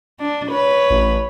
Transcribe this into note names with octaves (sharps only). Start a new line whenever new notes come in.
D4
B4 C#5
A1